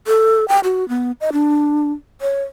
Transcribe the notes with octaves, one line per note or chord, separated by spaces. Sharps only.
A4
G5
F#4
B3
D#5
D4
C#5